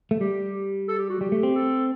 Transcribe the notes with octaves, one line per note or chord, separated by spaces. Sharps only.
A3
G3 G4
A4
G4
F#4
G3 G4
A3
C4
A4